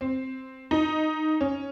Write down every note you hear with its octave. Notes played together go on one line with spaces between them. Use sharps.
C4
D#4
C#4